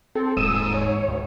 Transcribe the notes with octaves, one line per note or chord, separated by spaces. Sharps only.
C4 A4
D#1 G#2 D#6 E6
C#5
D2